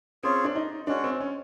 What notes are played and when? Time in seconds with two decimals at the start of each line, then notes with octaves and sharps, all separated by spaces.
0.23 C4 C#4 F4 G#4
0.44 D4
0.55 D#4
0.87 G#3 C#4 D4 F#4
1.04 C4
1.20 C#4